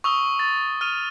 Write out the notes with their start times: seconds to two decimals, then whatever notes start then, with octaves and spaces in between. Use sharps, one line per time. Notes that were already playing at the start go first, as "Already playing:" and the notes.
0.04 C#6 D#6 E6 G7
0.39 A6
0.81 F6 D#7 F7